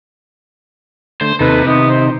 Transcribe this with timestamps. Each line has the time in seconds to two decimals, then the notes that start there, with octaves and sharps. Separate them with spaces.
1.21 D3 A3 C5
1.40 D#2 C3 D#4 A4 B4
1.67 D#3 B3 D#4
1.89 C5